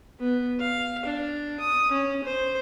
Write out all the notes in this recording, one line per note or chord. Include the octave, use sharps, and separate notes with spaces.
B3
F5
D4
D#6
C#4
C5